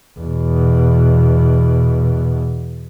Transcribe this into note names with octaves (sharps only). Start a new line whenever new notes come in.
E2 B2